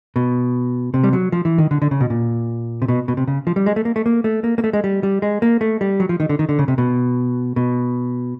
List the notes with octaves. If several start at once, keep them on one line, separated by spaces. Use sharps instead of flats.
B2
C3
G3
F#3
F3
E3
D#3
D3
D3
C#3
B2
A#2
C3
B2
B2
C3
C#3
F3
G3
G#3
A3
A#3
A3
A#3
A3
A#3
A#3
A3
G#3
G3
G3
G#3
A#3
A3
G3
F#3
F3
D#3
D3
D#3
D3
C#3
C3
B2
B2